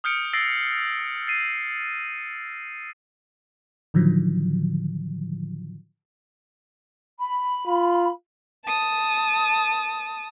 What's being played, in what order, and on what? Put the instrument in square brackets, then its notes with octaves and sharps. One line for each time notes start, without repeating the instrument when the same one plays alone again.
[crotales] D#6 F6 G6 C#7 D7
E6 A6 A#6 C7 D7
A6 C7 D#7
[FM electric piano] A2 D3 D#3 F3 F#3
[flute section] B5
[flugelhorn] F4
[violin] A5 D#6